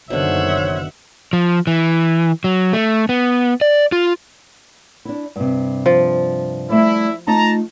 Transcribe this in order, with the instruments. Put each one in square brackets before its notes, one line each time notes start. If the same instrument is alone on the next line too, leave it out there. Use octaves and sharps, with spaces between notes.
[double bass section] F#1 D#3 [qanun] B2 D3 [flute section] C5 C#5 [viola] E5 F#5
[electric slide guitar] F3
E3
F#3
A3
B3
D5
F4
[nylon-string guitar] D4 E4
G2 C3
[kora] F3
[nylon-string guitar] G3 A3 D5 [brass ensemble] E4
[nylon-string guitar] A3 D#4 F4 [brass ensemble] A5 A#5